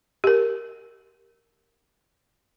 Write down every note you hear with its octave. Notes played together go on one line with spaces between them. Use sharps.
G4 A#4